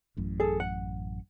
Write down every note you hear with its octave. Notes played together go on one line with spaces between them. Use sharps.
A1 F#2 A2
G#4 A4
F#5